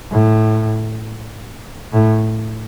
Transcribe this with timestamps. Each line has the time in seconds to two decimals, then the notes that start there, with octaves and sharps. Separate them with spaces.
0.11 A2
1.93 A2